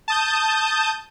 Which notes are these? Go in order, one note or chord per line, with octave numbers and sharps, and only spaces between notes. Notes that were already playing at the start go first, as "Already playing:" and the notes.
A5 D#6 G6